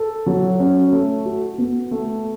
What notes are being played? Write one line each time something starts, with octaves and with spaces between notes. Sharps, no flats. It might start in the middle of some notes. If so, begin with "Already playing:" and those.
Already playing: A4
F#3
C#4
A3
F#4
B3
A3